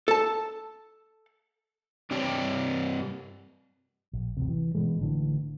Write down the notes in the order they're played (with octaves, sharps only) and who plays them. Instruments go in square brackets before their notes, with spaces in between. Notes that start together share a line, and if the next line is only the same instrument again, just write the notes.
[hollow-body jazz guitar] A4 A5
[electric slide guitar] G2 C4 D4 G4 C#5 G5
[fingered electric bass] A#1
D1 A1 C3
E3
B2 E3 G#3
A1 D3 E3